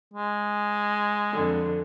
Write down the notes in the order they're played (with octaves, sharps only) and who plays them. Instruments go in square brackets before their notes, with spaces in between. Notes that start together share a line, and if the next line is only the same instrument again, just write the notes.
[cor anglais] G#3
[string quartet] F2 D3